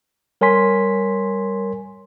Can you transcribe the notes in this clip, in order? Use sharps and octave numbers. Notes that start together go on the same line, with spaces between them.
G3 A#4 C#5 G#5 C6 B6